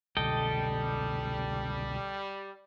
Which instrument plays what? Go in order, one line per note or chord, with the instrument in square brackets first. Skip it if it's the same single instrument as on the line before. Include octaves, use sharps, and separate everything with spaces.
[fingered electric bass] C2 B2 D3 [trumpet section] G3 [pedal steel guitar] A4 D#5 G5